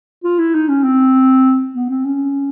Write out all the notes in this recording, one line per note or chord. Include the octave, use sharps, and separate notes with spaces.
F4
E4
D#4
C#4
C4
B3
C4
C#4